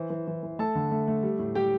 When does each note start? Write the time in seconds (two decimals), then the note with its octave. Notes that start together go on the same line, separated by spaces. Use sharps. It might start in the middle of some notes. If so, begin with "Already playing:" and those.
Already playing: E3 C5
0.10 E3
0.27 E3
0.43 E3
0.59 A3 A4 A5
0.75 D3
0.91 A3
1.08 A3
1.23 G3
1.39 A2
1.55 G3 G4 G5